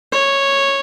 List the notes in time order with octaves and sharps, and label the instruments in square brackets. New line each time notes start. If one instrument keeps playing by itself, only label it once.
[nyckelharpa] C#5